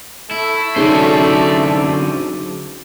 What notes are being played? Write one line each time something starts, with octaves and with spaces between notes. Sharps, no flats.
A3 E4
D3 F#3 C#4 D#4 F#4 G#4 C5 D5